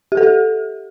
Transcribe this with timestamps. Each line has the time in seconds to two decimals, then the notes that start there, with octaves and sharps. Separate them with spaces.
0.12 G4
0.17 A4
0.23 G4